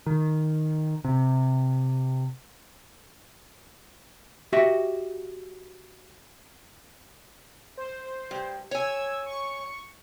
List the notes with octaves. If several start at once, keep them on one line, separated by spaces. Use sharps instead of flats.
D#3
C3
F#4 G4 D#5 E5
C5
G2
C#5 G#5 E6 G#6
C#6